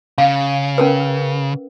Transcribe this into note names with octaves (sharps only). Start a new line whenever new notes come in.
C#3 F5
C#4 A#4 B4